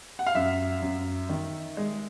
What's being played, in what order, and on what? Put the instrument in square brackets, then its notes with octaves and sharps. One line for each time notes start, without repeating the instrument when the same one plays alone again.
[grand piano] F#5
F5
F#2 E5
F#2
D#3
G#3